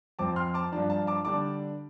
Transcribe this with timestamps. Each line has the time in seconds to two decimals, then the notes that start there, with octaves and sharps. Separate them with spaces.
0.19 F2 F3 C4 A5 D6
0.36 C6 F6
0.54 A5 D6
0.72 G2 F3 D4 A5
0.90 A5
1.07 A5 D6
1.25 D3 G3 D4 A5 D6